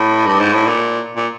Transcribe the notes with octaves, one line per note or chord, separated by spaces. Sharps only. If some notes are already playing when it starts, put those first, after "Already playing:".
Already playing: A2
G2
G#2
A2
A#2
A#2